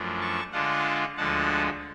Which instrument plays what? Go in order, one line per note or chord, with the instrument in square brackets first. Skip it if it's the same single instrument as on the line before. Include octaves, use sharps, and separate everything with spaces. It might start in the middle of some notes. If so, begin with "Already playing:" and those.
Already playing: [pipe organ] F#2 F3 A3 D4
A5 C#6
D3 G#3 D4 F4 F#5 A5
D2 D3 F3 G#3 F#5 A5